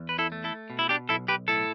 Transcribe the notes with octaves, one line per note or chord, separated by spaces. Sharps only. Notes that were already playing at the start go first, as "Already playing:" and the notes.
Already playing: E2
B4
E4 A4
A3
E4 A4
B2
E4
D4 G4
B1 E4 A4
G4 B4
A2 E4 A4